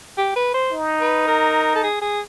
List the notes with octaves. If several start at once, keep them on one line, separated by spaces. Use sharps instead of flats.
G4
B4
C5
D#4
B4
A#4
A4
G#4
G#4